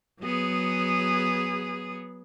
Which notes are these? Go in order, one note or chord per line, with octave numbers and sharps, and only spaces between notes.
F#3 B3 G#4